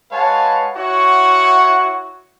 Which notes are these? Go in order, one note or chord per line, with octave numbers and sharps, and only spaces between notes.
G#3 B4 C#5 F5 F#5 A5
E4 F#4 C#5 F#5 C#6